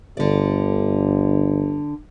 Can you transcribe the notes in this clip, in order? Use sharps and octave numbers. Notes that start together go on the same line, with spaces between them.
G1 D3 D5